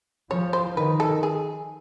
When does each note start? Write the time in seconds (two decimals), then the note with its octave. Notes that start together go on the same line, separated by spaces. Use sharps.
0.30 F3 C#5
0.53 C5
0.77 D#3 B4
1.00 A4
1.23 G#4